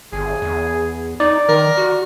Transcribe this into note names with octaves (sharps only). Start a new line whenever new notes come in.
G1 G#4
E2
D#4 D5
D#3 A#4
F#4